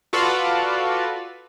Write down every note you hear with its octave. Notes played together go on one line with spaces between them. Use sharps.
F4 F#4 A4 B4 D5 F5